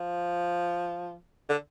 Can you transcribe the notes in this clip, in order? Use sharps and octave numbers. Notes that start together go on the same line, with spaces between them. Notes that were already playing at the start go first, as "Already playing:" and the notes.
Already playing: F3
D3